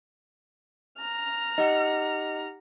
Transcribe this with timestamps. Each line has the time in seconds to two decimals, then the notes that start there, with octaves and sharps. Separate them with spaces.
0.98 A#5 F6
1.58 D#4 G4 D#5 F#5